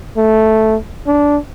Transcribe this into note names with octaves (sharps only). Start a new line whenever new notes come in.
A3
D4